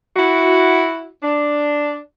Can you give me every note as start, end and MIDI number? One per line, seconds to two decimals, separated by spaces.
0.17 1.08 64
0.17 1.08 66
1.22 1.98 62